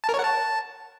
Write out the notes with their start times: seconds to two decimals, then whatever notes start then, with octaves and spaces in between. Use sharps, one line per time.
0.04 A5
0.09 A#4
0.14 C#5
0.19 F#5
0.24 A5